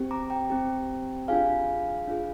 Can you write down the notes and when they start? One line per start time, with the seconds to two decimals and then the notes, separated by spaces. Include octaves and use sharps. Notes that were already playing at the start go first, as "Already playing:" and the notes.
Already playing: C4 G4
0.11 A#5 D6
0.30 G5 A#5
0.50 C4 G4
1.28 D4 F4 G#4 F5 G#5
2.07 D4 F4 G#4